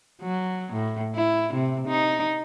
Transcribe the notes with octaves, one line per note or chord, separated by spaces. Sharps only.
F#3
A2
E4
C3
D#4